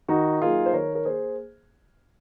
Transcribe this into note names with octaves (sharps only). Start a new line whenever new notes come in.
D#3 D#4 F#4
F#3 A#3 D#4 F4 G#4
C5
D#3 A#4 C#5
A#4
A#3 G#4 C5